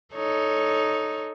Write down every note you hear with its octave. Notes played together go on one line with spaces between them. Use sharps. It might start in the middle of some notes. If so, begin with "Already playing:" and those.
D#4 A4 C#5